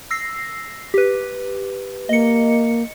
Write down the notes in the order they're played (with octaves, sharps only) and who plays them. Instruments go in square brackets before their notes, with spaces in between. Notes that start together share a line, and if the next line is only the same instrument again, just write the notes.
[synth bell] E6 A#6 C7
G4 B4
[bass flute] A#3 [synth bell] D#5 C#7